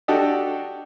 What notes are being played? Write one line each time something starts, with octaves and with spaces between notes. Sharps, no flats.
D4 F#4 G4 A4 D#5